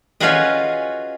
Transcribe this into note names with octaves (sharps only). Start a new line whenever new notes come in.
C#4 F4 F#4 G#4 B4 D#5